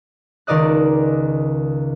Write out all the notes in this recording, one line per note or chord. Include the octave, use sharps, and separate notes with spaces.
C#2 D#3 A#4 D5 D#5 F#6